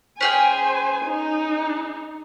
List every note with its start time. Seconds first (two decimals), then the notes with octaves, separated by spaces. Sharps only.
0.21 C#4 G#4 C5 G5 G#5
1.05 D#4